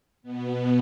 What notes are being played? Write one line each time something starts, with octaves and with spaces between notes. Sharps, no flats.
B2 B3